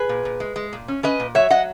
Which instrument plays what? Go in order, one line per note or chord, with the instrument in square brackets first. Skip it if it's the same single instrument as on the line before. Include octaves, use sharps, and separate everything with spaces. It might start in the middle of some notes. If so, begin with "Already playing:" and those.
Already playing: [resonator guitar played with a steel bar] G#4 B4
A#2
A#2
G#3
G#3
A#2
C#4
C#4 B4 D#5
A#2
F#3 C#5 E5
F#3 D#5 F#5